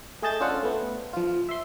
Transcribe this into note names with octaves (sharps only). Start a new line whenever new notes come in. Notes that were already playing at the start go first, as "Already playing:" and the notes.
A3 G#4 D#5 A5 G6 A6
C#4 D4 F4 A4 C5 F#5
A3 B3
F3 F4
E5 C6